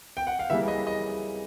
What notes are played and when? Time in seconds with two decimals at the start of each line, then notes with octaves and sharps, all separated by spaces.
0.17 G5
0.27 F#5
0.39 F5
0.50 C#3 E3 G3 A#3 E5
0.68 D#5
0.87 D#5